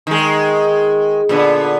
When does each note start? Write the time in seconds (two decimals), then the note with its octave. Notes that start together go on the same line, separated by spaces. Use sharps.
0.07 D#3 G#3
1.29 A#2 D3 B3